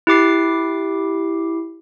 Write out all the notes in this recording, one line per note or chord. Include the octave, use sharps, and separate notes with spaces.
E4 G4 D6 C7